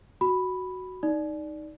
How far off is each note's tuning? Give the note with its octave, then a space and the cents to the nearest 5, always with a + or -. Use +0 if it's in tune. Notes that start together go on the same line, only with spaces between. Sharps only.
F#4 +0 B5 +0
D#4 +0 D5 +0